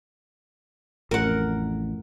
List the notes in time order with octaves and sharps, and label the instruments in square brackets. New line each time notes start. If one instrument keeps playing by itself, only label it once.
[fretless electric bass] A1 F2 [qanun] A#4 F#5